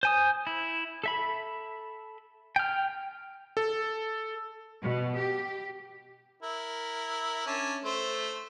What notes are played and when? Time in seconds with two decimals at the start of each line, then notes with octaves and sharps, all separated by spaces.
0.03 C5 G#5 D#6
0.47 E4
1.04 A4 E5 B5
2.56 G5 F6
3.57 A4
4.82 B2
5.17 G4
6.42 E4 A#4
7.47 C#4 D4
7.85 A3 C5